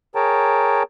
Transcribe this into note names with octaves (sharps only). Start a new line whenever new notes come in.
G#4 A#4 C#5 G5 A5 A#5